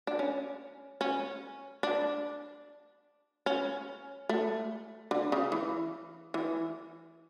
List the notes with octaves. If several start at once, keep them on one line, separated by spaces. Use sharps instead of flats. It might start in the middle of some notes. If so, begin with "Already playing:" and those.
D4
C#4
C#4
D4
C#4
A3
D3
C#3
E3
E3